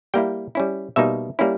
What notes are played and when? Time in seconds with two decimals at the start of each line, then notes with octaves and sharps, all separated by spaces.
0.14 G3 A#3 E4 G5
0.55 G3 C#4 E4
0.96 B2 G3 A#3 D#4 E5
1.39 G3 A#3 C#4 E4